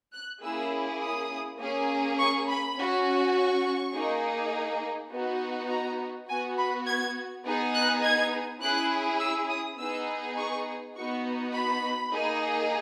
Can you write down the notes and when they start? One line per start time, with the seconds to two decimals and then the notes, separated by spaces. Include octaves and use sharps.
0.13 F#6
0.43 A#3 C#4 E4 G#4 E6
1.01 D#6
1.59 A#3 C#4 G#4
2.19 C#6
2.48 B5
2.77 C#4 F#4
3.35 C#6
3.94 A#3 D#4 G#4
5.11 B3 D#4 F#4
5.70 A#5
6.28 B3 F#4 G#5
6.57 B5
6.87 G#6
7.44 B3 D#4 G#4
7.75 F#6
8.04 G#6
8.61 C#4 E4 G#4 F#6
9.20 E6
9.49 D#6
9.79 B3 D#4 G#4 E6
10.37 C#6
10.96 B3 D#4 F#4 C#6
11.54 B5
12.13 A#3 D#4 G#4